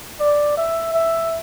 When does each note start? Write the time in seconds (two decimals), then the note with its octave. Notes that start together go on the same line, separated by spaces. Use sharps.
0.20 D5
0.57 E5
0.94 E5